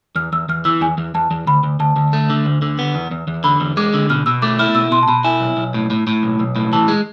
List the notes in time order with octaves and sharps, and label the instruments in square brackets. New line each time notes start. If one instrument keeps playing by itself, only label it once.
[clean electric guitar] E2 [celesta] F6
[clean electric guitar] E2 [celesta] E6
[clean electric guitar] E2 [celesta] F6
[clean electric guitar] E3 [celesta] E6
[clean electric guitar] E2 [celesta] G#5
[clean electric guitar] E2
[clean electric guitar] E2 [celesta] A5
[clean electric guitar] E2
[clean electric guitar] D2 [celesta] B5
[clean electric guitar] D2
[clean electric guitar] D2 [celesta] A5
[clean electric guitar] D2
A3
D3
D2
D3
B3
E2
E2
E2
[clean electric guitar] D3 [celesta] B5
[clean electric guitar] E2
[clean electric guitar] G#3 [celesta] D6
[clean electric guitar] D3
[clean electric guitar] B2 [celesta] F6
[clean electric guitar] B2 [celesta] E6
[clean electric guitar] A3 [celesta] D6
[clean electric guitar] E4 [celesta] F6
[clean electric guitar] B2 [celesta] E6
[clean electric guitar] B2 [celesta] C6
[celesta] A5
[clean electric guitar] B2 [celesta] B5
[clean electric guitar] E4 [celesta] G#5
[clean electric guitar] B1
B1
A2
A2
A2
B1
B1
A2
[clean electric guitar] E3 [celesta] A5
[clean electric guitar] G#3